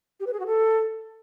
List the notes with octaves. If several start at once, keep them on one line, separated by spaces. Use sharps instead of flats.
G4
B4
G#4
F#4
A4